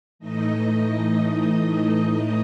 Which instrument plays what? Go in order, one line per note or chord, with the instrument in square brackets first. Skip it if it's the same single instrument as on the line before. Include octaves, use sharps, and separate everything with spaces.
[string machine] A2 E3 A3 D#4 D#5